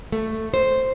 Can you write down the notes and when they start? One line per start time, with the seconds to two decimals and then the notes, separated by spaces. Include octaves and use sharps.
0.12 A3
0.54 C5